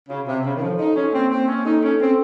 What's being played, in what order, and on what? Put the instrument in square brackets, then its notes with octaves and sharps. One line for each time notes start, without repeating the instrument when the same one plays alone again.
[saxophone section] C#3 [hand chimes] F#4
[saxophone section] C3 [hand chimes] F#4
[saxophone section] C#3 [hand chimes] C#5
[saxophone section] D#3
[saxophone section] F3 [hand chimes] A4
[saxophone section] D#4 [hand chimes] A4
[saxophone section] C#4 [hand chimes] F#4
[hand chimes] A#3 [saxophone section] C4
[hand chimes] A#3 [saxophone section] C4
[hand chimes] A#3 [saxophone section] C#4
[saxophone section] D#4 [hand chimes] A4
[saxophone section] C#4 [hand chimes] A4
[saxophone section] C4 [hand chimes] C#4